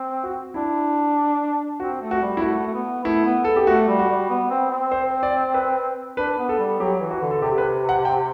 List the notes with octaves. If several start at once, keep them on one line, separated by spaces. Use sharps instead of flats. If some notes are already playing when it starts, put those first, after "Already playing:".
Already playing: C4
F#4
D4 E4
C4 F#4
A3
F#4
G3
E4
A3 F#4
A3
B3
A3 E4
B3
A4
G4
A3 F#4
G3
F#4
G3
B3
C4
C4
C5
D5
B4
D4 B4
B3
A4
G3
F#3 G4
E3
F#4
D3
A4
C3 G4
B4
F#5
G5